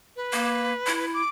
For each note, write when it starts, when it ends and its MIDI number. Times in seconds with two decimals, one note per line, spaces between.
0.16 1.06 71
0.33 0.72 58
0.87 1.22 64
1.14 1.29 86